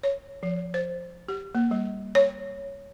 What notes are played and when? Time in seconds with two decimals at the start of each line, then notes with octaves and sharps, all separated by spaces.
0.03 C#5
0.43 F3
0.74 C5
1.29 G4
1.55 A#3
1.71 G3
2.15 C#5